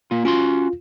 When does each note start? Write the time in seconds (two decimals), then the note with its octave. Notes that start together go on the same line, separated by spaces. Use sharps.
0.11 A#3 F4
0.25 C#4 F4 F#4 C6